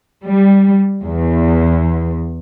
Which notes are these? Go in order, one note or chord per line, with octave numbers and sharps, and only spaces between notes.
G3
E2